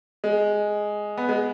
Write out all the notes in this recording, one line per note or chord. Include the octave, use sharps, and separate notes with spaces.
G#3
B3
G#3